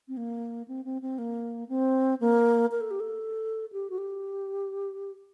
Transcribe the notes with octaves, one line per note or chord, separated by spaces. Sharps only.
C4
A#3
C4
C4
C4
A#3
C4
A#3
A#4
A4
G4
A4
G4
F#4
G4